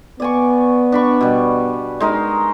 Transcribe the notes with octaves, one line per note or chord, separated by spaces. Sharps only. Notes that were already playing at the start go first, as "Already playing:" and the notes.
B3 D5 G#5 C#6
D4 B5 C#6
B2 G3
G#3 D#4 A#4